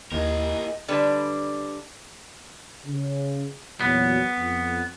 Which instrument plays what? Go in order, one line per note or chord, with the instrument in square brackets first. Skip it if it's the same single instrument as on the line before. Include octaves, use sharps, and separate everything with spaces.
[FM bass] D#2 [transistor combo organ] A#3 E4 G4 [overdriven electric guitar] G#4 A#4 [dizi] D#5
[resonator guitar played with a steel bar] D3 G3 D4 B4
[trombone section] C#3
[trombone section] E2 A#2 F#3 [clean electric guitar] B3
[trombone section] F2